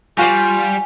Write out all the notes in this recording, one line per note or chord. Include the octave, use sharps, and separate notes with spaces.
G3 F4 F#4 C5 D5 G#5